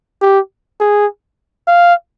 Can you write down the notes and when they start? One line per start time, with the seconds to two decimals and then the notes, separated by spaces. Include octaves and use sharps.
0.22 G4
0.80 G#4
1.68 F5